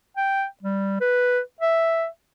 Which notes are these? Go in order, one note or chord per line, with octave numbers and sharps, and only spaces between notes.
G5
G3
B4
E5